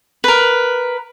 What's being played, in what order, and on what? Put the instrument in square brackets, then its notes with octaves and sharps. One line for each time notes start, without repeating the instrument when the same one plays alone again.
[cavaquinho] A#4 B4